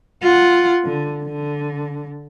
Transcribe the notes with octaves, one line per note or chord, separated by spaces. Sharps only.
F4 F#5
D3
D3